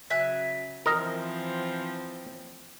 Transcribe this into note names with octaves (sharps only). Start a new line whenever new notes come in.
C#3 F#3 E5 G#5 F#6
E3 F3 C4 A#4 D#5